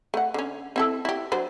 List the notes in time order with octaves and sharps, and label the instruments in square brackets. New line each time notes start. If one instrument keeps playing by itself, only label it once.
[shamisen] A3 F#5
D3 C#4
C4 E4 A4
E4 G4
F#3 D4 C5